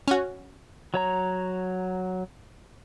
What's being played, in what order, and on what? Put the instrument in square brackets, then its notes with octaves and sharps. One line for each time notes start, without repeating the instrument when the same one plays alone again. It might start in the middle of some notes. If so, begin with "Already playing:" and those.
[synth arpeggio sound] C#4 F#4
[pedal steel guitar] F#3 C#5 A#5